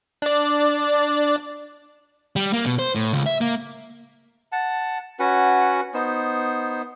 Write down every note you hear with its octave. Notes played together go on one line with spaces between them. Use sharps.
D4 D5
G3
A#3
B2
C5
A2
C#2
E5
A#3
F#5 A5
C#4 F#4 B4 F#5
B3 D#4 C5